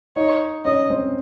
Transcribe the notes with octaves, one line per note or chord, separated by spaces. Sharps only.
D#4 C#5 D#5
C#4 C#5 D#5
C4 C5